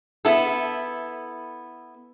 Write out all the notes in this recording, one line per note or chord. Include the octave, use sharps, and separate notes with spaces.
B3 E4 A4